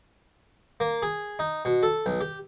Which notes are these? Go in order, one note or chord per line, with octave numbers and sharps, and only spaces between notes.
A#3
G#4
D#4
B2
A4
B1
G4